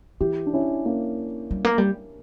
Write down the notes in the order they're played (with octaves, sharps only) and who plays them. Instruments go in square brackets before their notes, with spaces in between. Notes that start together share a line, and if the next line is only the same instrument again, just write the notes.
[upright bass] E3 [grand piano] E4 G4
[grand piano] D4
C#4 E4
A#3 C#4
[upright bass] G3
A#3
G3